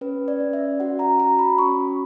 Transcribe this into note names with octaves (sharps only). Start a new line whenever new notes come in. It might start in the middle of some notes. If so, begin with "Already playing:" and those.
C#4 B4
D5
C#4
E5
F#4 F#5
A#5
F#4 A#5
B5
C#4 C#6